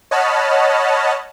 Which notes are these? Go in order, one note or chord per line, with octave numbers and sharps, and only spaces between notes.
C#5 D#5 F#5 A5 B5 F6